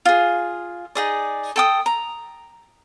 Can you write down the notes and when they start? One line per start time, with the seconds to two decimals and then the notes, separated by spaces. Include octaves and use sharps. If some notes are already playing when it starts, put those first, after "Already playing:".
0.05 F4 G#4
0.95 D#4 G#4 D5
1.56 A4 G5 D#6
1.86 A#5